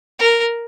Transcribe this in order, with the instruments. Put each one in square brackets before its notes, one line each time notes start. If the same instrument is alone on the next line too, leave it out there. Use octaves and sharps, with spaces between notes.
[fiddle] A#4